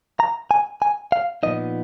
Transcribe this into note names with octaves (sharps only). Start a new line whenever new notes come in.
A#5
G#5
G#5
F5
A#2 F3 B3 D#4 D#5